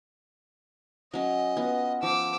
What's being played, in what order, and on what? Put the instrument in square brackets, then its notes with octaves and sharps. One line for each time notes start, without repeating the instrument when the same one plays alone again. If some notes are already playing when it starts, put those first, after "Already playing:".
[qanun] F#3 C#4 [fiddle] D#5
[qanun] B3 F4
[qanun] F3 [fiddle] D6 E6